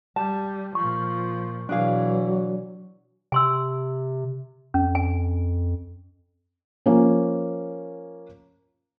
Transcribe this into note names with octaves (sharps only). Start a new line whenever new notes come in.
G3 A5
A#2 F3 C#6
B2 E3 F#3 D4 G#4 F5
C3 G#5 C6 E6
F2 C#4
G#5
F3 A#3 C#4